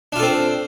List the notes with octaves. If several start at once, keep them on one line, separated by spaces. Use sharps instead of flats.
C4 D4 F4 A4